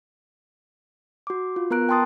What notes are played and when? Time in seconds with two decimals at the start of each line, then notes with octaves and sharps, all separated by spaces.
1.27 F#4 D6
1.56 F4
1.71 B3 A#4 A#5 F#6 D7
1.89 G5 A5 C6 D#6 A6